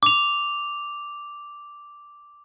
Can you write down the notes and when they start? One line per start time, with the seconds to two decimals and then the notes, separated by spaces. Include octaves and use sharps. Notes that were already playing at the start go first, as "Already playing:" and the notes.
0.03 D6 F7